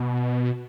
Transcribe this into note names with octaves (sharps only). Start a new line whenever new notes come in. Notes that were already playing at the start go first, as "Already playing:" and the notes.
Already playing: B2